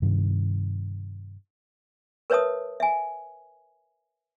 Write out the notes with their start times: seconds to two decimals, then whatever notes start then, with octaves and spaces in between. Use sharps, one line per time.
0.02 G2 C3 D#3
2.30 A#4 B4 C#5 E5 A5 D#6
2.80 E5 G#5